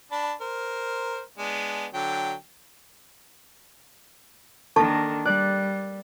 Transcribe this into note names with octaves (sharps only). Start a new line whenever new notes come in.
D4 A5 B5
A#4 C5
G#3 B3 D4
D3 F#3 G5
D#3 A#3 D4 A4 A5 C#6
G3 D5 D6 F#6